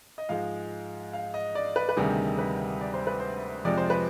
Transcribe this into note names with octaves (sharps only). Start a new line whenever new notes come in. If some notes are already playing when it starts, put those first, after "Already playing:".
D#5
G#2 F3 G#3 F5
F5
D#5
D5
B4
B4
D2 C3 D#3 G3 G#4
B4
D5
C5
B4
C5
F2 C3 F3 G#3 D5
C5
B4